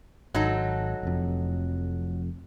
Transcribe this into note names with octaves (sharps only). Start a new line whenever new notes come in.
G#1 F#3 D#4 A4
F1 F2